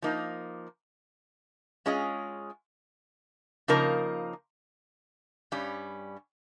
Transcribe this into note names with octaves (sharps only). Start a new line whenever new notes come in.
F3 A#3 D#4
G#3 C#4 F4 G#4 D#5
C#3 F3 A#3 D#4 A#4
G2 G3 C#4